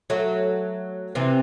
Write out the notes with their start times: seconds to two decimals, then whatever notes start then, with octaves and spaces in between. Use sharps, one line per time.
0.10 F#3 A3
1.15 C3 E3